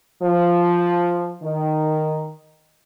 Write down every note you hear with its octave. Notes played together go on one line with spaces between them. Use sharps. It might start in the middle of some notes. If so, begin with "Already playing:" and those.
F3
D#3